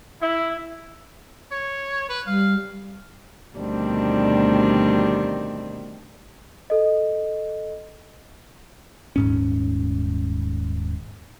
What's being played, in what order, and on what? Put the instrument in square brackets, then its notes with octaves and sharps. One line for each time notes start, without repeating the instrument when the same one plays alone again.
[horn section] E4
[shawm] C#5
B4
[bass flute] G3 [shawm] F5
[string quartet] D2 B2 D#3 G3 C4 D4
[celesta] A4 D#5
[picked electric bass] D#1 G#2 C#4